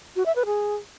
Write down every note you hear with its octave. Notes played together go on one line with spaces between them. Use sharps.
F#4
E5
B4
G#4